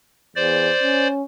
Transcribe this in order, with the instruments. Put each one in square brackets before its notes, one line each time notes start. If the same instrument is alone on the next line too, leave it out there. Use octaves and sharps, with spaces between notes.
[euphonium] E2 [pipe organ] C5 D5
[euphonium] C#4